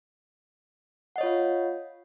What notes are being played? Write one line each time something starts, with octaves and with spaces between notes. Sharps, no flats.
F4 C#5 D#5 F5 F#5